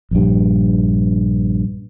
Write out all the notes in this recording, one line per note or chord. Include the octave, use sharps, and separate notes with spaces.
A#1 G2